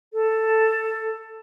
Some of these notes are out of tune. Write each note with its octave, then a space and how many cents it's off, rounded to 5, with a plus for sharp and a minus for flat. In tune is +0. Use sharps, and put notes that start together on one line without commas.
A4 +10